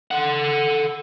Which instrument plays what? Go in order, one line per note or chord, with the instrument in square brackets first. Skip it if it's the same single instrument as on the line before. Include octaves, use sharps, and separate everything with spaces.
[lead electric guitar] A4 F#5